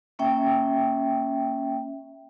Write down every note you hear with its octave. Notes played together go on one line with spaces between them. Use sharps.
A#3 C#4 E5 G5